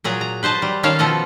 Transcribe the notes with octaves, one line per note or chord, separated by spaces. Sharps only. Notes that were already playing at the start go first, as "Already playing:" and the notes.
A#2 F#3 G#4 A#5
A#5
B4 C5 D#5 A5
G3
D#3 C#4 C#5 F5 A5
B2 F3 A4 D#5 F5